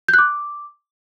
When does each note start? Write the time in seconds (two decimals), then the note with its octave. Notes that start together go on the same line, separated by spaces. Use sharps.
0.08 G6
0.14 F#6
0.19 D6